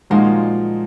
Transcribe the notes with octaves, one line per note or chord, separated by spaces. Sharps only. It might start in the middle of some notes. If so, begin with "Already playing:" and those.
A#2 F3 G#3 A#3 D#4 F#4